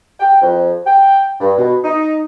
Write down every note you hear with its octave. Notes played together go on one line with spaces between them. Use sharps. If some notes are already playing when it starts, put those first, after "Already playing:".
G5
F2
G5
G2
B2
D#4